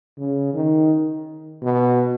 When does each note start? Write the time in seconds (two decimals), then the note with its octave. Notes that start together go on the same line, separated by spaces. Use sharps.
0.18 C#3
0.54 D#3
1.62 B2